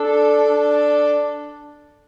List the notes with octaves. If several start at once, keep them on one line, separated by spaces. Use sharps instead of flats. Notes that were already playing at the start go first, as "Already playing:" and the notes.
Already playing: D4 A4
D4